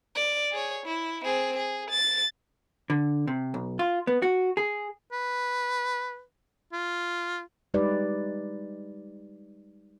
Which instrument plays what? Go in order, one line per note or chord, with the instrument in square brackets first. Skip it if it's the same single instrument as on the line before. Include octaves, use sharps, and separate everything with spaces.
[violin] D5
G#4 C#5
E4
C4 G#4
G#4
A6
[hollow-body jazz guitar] D3
C3
B1
F4
B3
F#4
G#4
[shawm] B4
F4
[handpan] G3 G#3 D#4 G4 B4 D5